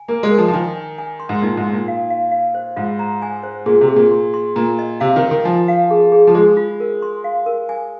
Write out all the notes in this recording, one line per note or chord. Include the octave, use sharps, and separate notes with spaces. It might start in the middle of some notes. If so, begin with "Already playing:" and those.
Already playing: G#5
A#3 A#4
G#3
A#4
F3
F3
D#3 G#5
G#5
G#5
C6
G#2
A#2 D#4
G#2
D#4
A#2
F5
F5
F5
C5
G#2 F4
A#5
G#5
C5
A#2 G#4
C3
G#4
A#2
C6
C6
A#2 A#5
D#5
C3 F5
D#3
A#4
D#3
F3 G#5
F5
G#4
G#4
F3
G#3 G#4
F4
A#4
C6
F5
A#4
G#5